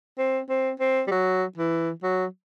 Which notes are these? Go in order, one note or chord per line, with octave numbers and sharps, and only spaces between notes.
C4
C4
C4
G3
F#3
E3
F#3